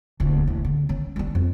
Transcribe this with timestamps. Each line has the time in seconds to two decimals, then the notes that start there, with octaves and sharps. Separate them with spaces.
0.20 D#1 D2
0.47 A1
0.65 D3
0.89 D#3 C#4
1.16 G3 D4
1.35 F2 F#3